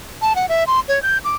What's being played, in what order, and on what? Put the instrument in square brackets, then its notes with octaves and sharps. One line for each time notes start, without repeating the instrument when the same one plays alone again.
[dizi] A5
F#5
E5
C6
C#5
G6
D6